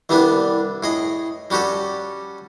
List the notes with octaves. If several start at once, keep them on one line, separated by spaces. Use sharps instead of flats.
C2 E3 G3 B3 D4
A2 G#4 D#5
G3 C#4 F#4 G4 A4